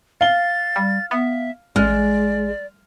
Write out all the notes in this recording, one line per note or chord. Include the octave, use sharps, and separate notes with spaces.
F5 A6 G7
G3
B3 E5
A1 G#3 D5 F6